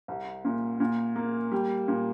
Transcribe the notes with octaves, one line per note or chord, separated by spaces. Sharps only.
C2
A#2
A#2
A#3
G3
A#2